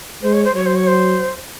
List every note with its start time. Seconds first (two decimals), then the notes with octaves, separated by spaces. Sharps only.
0.22 G#3 C5
0.33 C#5
0.45 C5
0.54 F#3 C#5
0.66 C5
0.76 C#5
0.87 C5